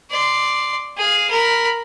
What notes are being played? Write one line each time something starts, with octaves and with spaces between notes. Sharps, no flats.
D5 C6
G#4 F5
A#4 B5